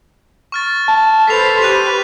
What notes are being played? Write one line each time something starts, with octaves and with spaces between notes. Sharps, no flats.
C#6 F6 A6
A5
A4 B4 C5 B6 C7 F7
G4 B4 F#6 D#7 F7